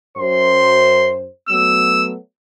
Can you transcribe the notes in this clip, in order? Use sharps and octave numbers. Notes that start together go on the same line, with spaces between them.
F#2 C5 C6
F#3 A3 B3 E6